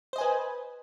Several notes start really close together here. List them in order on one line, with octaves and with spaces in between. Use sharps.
C5 D#5 G#5 B4